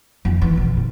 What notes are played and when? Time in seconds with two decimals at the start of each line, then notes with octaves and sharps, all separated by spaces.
0.25 F2
0.41 E3
0.57 B2
0.77 A#2